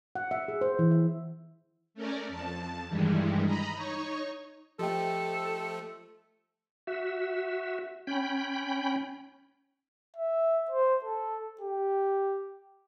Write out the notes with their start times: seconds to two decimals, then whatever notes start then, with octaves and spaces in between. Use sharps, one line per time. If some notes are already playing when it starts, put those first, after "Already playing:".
0.15 F#5
0.31 E5
0.48 G#4
0.61 C5
0.79 E3
0.91 E5
1.94 A3 C#4 A#4 D5
2.28 F2 A5
2.89 G2 D#3 E3 G3 G#3
3.45 D#5 A#5 B5
3.75 D#4 C#5 C#6
4.79 F3 A3 G4 A4 D#5 G5
6.87 F#4 E5
8.07 C#4 G5 B5
10.16 E5
10.71 C5
11.05 A4
11.61 G4